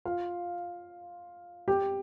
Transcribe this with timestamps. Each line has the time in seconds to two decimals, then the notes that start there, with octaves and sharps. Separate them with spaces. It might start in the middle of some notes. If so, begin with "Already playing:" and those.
0.06 F4 F5
1.68 G4 G5